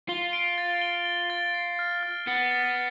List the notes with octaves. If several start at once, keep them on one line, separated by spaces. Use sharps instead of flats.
F4 G7
D7
A6
G7
G7
A6
C7
F6
F6
B3 A6
A6